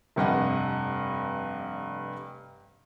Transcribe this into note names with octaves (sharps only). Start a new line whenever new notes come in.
F1 G2 D#5 F#5